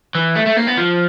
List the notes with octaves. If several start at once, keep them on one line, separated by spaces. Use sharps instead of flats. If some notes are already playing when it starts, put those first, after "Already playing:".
E3
A3
A3
A#3
B3
F3